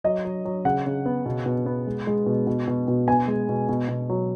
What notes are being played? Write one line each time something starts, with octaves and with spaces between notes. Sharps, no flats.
F#3 D#5
F#3
F#3
C#3 F#5
C#3
B3
B2
B2
B3
G#3
G#3
B2
B2
B2
B2
B3 G#5
G#3
B2
B2
B2
F#3